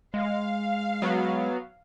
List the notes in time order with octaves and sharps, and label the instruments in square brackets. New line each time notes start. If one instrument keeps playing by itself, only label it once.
[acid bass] G#3 [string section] F5
[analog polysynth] F#3 B3